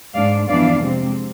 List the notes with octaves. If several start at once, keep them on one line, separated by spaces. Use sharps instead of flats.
G#2 G#3 D4 D5 F5
F2 E3 B3 D4 D5 F5
C3 G#3 C4